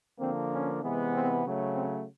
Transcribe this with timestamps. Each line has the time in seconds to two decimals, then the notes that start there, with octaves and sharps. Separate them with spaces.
0.20 D3 F3 A#3 C4
0.51 C#4
0.81 C3 E3 G#3 B3
1.13 C4
1.43 C#3 F#3 A3
1.74 C4